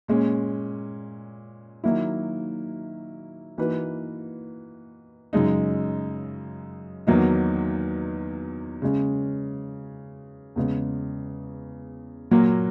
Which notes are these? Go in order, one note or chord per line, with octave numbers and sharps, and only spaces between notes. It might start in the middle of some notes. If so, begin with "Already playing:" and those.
A#2 G#3 C#4
D#3 F#3 A#3 E4
E3 A#3 D#4 F#4 B4
F#2 C#3 G#3 D#4
E2 D#3 F#3 A#3 D#4
C#3 G#3 C#4
E2 C#3 G#3
A#2 F#3 A#3